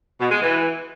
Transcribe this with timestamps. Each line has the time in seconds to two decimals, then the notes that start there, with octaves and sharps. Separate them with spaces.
0.20 B2
0.31 G#3
0.42 E3